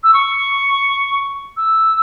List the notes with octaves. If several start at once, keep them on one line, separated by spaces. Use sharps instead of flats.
E6
C#6
E6